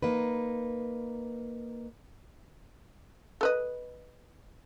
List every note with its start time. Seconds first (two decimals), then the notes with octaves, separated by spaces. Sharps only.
0.02 A#3 D#4 B4
3.41 A4 B4 D#5